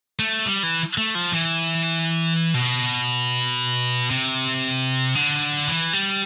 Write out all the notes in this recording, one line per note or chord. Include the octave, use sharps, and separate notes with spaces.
A3
G3
E3
A3
F3
E3
B2
C3
D3
E3
G3